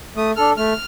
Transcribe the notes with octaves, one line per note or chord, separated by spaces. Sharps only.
A3 D#6
D4 A4 F6
A3 F6